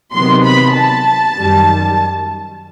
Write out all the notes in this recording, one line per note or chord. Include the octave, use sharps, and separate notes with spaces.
C3 D#3 F#3 B3 C6
B5
A5
F#2 D#3 G3